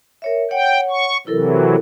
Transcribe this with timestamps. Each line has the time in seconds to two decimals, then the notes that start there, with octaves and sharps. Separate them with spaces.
0.22 A#4 C#5 E5
0.51 C#5 F#5 G5
0.90 C#6
1.27 C3 E3 F#3 E4 A4 A#4